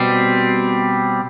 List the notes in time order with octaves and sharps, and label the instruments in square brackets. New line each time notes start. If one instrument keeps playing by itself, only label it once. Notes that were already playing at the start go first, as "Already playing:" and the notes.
Already playing: [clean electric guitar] B2 G3 C4